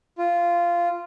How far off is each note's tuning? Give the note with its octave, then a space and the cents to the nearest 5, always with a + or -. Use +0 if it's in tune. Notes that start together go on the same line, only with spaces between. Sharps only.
F4 -10